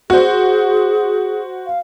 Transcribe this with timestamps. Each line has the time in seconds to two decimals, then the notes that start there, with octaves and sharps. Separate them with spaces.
0.10 F#4 G#4 C5
1.66 F5